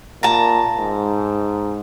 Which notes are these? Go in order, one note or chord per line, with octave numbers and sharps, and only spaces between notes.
A#2 A5 A#5
G#2